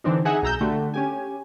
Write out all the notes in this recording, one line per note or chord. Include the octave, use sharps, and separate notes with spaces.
D3 E3 C4 D4 D#4
D#4 G#4 E5 F#5 G#5
B1 G#4 A#5 E6 G6
D3 A3 F#4 G4
C#4 G4 G#5